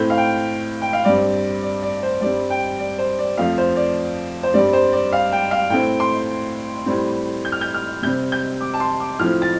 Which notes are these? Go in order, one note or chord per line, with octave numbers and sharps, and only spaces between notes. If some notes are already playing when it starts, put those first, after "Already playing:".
Already playing: A2 A3 C4 G6
F5
G5
G5
F5
G2 G3 C4 D5
D5
D5
C5
G2 G3 C4 D5
G5
D5
C5
D5
F2 F3 A3 F5
C5
D5
C5
G2 G3 C4 D5
C5
D5
F5
G5
F5
A2 A3 C4 G5
C6
A2 G3 C4
G6
F6
G6
F6
C3 G3 C4 G6
G6
D6
A5
C6
D6
A2 F3 A3 C4 F6
A6